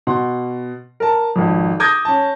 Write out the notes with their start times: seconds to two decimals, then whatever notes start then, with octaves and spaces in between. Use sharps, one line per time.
0.07 B2 F#5 C6
1.00 A#4 A5
1.36 G#1 F2
1.80 D6 D#6 G6 G#6 A#6
2.05 C#4 A5